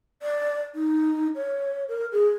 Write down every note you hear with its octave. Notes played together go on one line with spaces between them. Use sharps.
D5
D#4
C#5
A#4
G#4